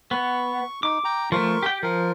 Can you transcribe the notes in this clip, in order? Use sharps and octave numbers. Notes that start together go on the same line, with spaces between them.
B3 C#6
D#4 D6
G5 A#5
F3 A3 A#4 C6 C#6
G4 G5
F3 A#4